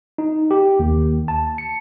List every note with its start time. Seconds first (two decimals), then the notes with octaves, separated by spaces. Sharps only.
0.18 D#4
0.51 G4
0.80 D#2
1.28 A5
1.58 C#7